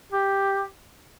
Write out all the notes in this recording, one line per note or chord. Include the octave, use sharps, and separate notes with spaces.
G4